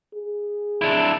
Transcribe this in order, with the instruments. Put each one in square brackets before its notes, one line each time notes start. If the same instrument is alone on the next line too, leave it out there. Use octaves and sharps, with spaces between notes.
[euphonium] G#4
[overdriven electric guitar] D4 E4